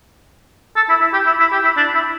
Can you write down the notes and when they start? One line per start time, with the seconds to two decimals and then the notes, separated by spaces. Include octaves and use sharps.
0.76 A4
0.89 E4
1.00 E4
1.13 G4
1.26 E4
1.40 E4
1.52 G4
1.64 E4
1.77 D4
1.94 E4